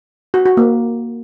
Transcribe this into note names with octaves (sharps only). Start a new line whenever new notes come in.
F#4
F#4
A#3